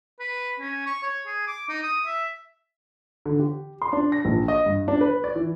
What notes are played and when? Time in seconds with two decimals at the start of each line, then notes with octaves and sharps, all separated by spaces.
0.20 B4
0.60 C#4
0.86 C#6
1.03 C#5
1.26 G#4
1.47 D6
1.69 D#4
1.83 D#6
2.06 E5
3.26 D3
3.39 G4
3.82 C6
3.93 D4
4.12 A#6
4.25 A#1
4.48 D#5
4.66 G2
4.88 D4
5.01 B4
5.24 D5
5.36 E3